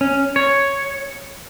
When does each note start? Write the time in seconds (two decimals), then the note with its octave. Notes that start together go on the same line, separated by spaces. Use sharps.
0.01 C#4
0.36 C#5